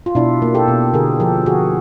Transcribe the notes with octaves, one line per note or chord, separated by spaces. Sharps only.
F4
B2 D4 E4
A#3
G4 A4
B2
D3 G#4 A#4
F3 G4 A4
D3 F#4 G#4